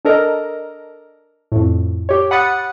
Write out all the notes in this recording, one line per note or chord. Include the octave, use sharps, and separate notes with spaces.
D4 A4 A#4 D#5
F2 A2
G4 C#5
F#5 B5 D#6 F#6 A6 C#7